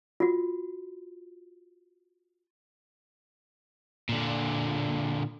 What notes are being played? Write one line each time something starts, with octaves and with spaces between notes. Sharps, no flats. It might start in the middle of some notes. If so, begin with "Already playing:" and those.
F4 F#4
A#2 D3